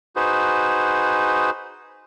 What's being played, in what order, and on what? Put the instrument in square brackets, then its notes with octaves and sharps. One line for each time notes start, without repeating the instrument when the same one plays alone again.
[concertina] D#4 F#4 G#4 B4 C5